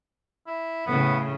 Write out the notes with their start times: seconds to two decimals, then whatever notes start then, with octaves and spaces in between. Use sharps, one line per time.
0.47 E4
0.86 A2 C#3 B3